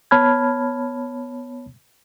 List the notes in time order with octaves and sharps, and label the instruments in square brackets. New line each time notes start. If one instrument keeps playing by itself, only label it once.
[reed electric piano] B3 C#5 A5 B5 F6 G#6